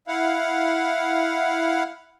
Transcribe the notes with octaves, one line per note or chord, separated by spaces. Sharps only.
E4 F5 F#5